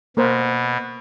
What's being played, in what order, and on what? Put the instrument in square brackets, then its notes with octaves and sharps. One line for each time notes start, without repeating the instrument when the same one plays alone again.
[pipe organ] B2 [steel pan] A#3 A#4 C5